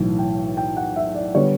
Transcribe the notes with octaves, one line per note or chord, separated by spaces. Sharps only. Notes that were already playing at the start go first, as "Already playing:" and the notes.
Already playing: B1 A2 E3
G5
G5
F#5
E5
D5
D3 G3 B3 C#5